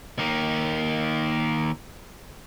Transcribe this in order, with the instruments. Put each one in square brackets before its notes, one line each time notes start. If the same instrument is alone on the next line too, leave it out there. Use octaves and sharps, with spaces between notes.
[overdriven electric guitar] D#3 A#3